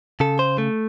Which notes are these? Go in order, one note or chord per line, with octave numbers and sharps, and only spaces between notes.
C#3 A4
C5
A3